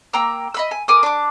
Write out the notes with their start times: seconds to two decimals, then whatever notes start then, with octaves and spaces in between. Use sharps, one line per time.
0.13 A#3 G5 A#5 E6
0.54 D#5 B5 E6
0.71 G#5
0.88 A#4 G#5 D6 D#6
1.03 D4 D6